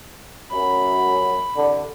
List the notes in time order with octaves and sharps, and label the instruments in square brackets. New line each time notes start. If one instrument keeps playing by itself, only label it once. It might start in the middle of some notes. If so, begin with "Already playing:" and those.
[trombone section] F#2 [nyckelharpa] B5
[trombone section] C2 D3